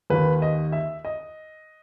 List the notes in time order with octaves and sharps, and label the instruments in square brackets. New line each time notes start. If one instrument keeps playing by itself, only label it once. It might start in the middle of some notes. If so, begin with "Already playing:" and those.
[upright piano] D#2 D#3 B4
D#5
E5
D#5